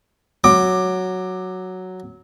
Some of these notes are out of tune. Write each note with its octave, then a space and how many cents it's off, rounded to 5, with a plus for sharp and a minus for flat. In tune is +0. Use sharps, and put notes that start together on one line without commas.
F#3 +0 D6 +15